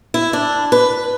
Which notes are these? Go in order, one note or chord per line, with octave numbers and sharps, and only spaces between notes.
E4
D4
B4